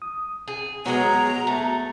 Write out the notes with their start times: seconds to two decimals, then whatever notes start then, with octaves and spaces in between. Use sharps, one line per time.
0.02 D#6
0.48 G#4
0.86 F#3 G#3 B3 F#4 A#5
1.47 A3